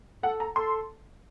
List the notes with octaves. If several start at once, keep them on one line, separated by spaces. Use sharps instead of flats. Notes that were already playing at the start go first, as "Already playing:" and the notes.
A4 F#5
A#5
A4 C6